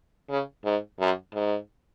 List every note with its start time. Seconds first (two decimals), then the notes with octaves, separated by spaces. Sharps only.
0.30 C#3
0.65 G#2
1.00 F#2
1.34 G#2